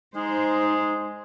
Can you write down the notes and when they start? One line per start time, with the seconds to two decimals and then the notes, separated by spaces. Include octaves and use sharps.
0.15 G#3 D#4 C5